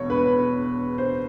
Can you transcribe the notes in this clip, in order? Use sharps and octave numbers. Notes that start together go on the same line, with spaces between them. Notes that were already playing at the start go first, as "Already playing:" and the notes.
Already playing: E1 E2 C#5
B4
C5